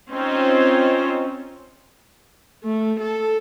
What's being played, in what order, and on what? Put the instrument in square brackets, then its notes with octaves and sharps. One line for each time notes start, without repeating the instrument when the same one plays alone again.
[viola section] C4 C#4 D#4 F4 C5 C#5
[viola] A3
A4